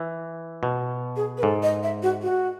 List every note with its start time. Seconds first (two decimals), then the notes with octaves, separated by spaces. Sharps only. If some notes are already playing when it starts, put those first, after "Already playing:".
Already playing: E3
0.63 B2
1.16 G#4
1.38 B4
1.43 G#2 A4
1.63 D#5
1.83 E5
2.03 F#4
2.23 F#4